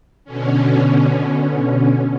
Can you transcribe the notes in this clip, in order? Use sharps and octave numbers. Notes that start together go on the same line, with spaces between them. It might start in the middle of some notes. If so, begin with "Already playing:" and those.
B2 D3 C#4